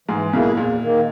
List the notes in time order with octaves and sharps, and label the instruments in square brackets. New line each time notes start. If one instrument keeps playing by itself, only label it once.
[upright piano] G#2 G#3 [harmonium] E3
[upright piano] B1 B2 [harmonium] A#3 E4 G#4
[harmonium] E2 [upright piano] A#2
[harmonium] D#3 A#3